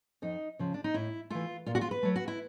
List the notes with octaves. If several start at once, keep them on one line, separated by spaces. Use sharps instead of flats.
F2 D#4
C#3 F3
D4
D#4
A2 E4
E3 A3 F4
A#2 F4
F#4
F4
B4
F#3 A3
F#4
E4